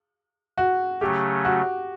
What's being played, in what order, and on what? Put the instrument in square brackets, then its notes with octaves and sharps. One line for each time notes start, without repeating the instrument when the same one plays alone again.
[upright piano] F#4
[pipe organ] C#3 F#3 A3 C#4 [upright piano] G4
[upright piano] F#4